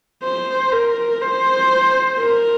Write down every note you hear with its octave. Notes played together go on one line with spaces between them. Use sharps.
C5
A#4
C5
A#4